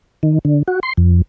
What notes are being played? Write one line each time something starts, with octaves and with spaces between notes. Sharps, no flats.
D#3
D3
F#4
C6
F2